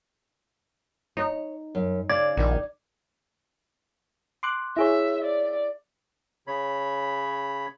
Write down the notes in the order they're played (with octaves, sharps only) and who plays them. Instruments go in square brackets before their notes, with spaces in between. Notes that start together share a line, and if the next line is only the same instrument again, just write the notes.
[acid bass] D#4 [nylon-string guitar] C#5
[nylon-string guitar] F#2
[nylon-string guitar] C#3 [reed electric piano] D5 [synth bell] G#6
[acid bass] A#1 [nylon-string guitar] D#3 D#4
[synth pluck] C6 D6 F#6
[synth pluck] E4 G#4 C#5 [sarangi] E5
[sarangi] D5
[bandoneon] C#3 C#5 B5